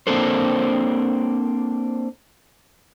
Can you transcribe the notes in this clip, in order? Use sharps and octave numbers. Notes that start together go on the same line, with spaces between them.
A#3 C4 D4 A4 C5